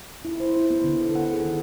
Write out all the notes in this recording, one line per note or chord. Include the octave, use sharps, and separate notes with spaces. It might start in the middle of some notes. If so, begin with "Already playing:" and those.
E4
C5
E4
B3
D3
A4
F#5
G#4
D#3